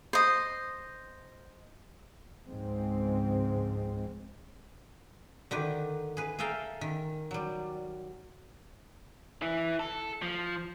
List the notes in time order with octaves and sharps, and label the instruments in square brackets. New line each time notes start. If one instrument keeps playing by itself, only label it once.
[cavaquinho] C5 D#5
[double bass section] C#2 G#2 F3 G#3 C4
[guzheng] D3 D#3 G4 B4
G#4 B4
G#4 A4 E5 F5 G5 A#5
D#3
F#3 G3
[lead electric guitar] E3 E4
A4
F3